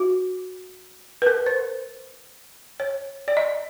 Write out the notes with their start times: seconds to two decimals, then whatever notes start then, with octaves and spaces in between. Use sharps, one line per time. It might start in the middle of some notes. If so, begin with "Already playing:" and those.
Already playing: F#4
1.22 B4
1.27 A#4
1.46 C5
2.80 C#5
3.28 D5
3.37 D#5